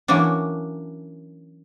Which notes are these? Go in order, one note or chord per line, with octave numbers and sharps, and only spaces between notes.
E3 F#3 A#3 C#4 D4